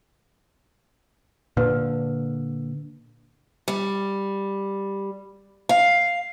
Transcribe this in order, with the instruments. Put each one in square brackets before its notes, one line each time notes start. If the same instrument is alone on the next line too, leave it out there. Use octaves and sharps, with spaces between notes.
[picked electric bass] A#2 D3 [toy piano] B4
[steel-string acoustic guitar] G3
F5